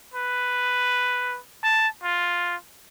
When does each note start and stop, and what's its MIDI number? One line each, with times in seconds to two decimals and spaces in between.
0.14 1.39 71
1.63 1.88 81
2.03 2.56 65